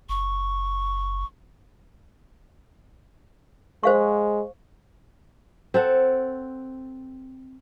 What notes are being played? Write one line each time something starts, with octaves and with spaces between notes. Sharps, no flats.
F#1 C#6
G#3 C5 F5 C#6
C4 A4 F#5